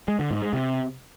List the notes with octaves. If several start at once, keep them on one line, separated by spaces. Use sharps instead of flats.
G#3
D3
G#2
G#3
C3